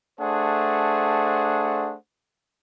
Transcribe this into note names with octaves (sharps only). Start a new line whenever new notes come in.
A3 D4 G#4 C5 F#5